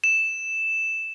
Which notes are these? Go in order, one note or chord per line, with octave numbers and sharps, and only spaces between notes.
E7